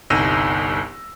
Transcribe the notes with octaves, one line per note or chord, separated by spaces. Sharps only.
G1 C2 D#4 E6 A#6 D#7